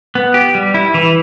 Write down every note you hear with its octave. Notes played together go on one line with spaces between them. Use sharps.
B3
G4
G3
E4
E3